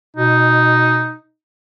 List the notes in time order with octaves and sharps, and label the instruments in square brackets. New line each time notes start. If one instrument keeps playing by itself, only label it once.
[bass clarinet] B2 [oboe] D#4